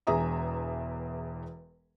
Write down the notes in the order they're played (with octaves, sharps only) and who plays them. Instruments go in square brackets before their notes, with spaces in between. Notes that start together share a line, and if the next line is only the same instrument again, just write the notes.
[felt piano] E1 E2 G#4 E5 A#5 D#6